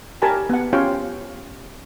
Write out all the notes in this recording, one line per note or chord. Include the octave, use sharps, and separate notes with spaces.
G4 A#4 G#5 A5 B5
B3 F#5
C#4 F4 G4 C#5 F5 G5